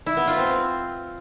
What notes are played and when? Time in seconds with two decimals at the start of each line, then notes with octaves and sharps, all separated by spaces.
0.06 E4
0.17 B3
0.27 F4
0.38 C4